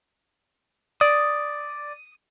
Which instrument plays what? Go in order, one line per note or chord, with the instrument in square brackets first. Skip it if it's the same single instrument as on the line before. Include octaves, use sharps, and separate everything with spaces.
[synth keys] D5 [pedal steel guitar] D#6